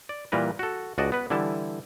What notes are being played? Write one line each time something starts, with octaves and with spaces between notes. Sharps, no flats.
D5
A#2 E3 G3 A#4 B4
F#4 A4
C#2 F#4 D5 D#5 A5
B3 B4
D3 E3 G3 E4 A5